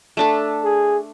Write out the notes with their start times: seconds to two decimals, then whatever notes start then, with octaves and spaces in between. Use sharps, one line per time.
0.17 A3 D4 A4
0.64 G#4